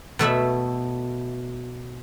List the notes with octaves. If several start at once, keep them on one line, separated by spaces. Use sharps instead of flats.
B2 A3 E5 B5